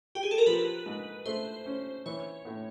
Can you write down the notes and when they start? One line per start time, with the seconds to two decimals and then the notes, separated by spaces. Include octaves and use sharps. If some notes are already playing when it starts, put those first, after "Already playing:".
0.15 G4
0.23 G#4
0.31 A4
0.38 A#4
0.46 F3 B4
0.86 G#2
1.26 A3 C5
1.66 C#4
2.06 E3 C#5
2.45 A2